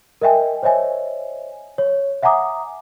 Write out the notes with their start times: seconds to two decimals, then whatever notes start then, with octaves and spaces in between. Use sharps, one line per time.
0.21 A#4 D#5 E5 G5 G#5
0.63 C5 C#5 D#5 E5 G#5
1.78 C#5
2.23 E5 F#5 G#5 A#5 D6 D#6